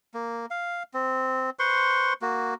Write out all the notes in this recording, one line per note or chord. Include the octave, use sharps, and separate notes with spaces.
A#3
F5
C4
B4 C5 C6 C#6
A#3 F#4